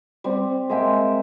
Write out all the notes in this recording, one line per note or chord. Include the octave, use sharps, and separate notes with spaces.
G3 C4
G#3 A#3 E5 G5